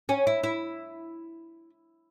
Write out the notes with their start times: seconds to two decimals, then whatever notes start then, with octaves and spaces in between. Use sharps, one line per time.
0.09 C#4
0.27 E4
0.43 E4